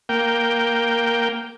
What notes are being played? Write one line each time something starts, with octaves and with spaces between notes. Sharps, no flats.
A#3 G5